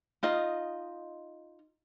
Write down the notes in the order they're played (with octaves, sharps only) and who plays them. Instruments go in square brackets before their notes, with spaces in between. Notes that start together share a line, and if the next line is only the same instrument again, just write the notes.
[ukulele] D#4 F4 D#5